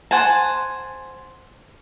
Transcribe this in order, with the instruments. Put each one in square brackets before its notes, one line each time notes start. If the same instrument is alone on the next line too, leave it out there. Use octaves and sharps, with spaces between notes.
[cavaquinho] C5 F#5 G#5 A5